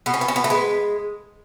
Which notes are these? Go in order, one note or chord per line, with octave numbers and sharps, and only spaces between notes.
B2 B3
C#4
B3
C#4
B3
A3
G#3 B3